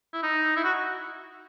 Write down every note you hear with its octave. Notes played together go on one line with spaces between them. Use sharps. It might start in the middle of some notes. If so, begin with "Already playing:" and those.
E4
D#4
E4
F#4